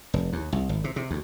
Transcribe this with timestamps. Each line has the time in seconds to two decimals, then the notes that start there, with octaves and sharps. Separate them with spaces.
0.14 F1
0.33 D#2
0.52 C2
0.69 G#1
0.84 C3
0.96 C3
1.11 D2